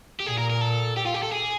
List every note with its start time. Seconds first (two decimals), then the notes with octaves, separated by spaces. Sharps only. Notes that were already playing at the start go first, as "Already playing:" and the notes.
0.20 G4
0.26 A#2 G#4
0.38 A#4
0.50 A#4
0.61 A4
0.97 G4
1.06 F4
1.14 G4
1.23 A4
1.32 G#4